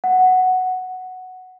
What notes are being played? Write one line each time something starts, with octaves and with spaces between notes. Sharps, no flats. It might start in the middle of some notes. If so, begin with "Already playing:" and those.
F#5